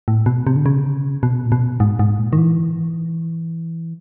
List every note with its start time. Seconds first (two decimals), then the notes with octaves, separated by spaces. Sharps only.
0.08 A2
0.26 B2
0.47 C3
0.56 D3
0.66 C#3
1.23 B2
1.46 A#2
1.52 B2
1.80 G#2
1.99 G#2
2.19 A#2
2.33 D#3
2.38 E3